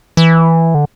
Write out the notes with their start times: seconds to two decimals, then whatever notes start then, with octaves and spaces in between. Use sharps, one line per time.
0.17 E3
0.75 D3